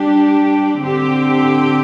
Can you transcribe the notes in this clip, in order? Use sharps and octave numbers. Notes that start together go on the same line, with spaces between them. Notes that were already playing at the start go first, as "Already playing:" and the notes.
Already playing: G3 D4 G4
D3 C4 G4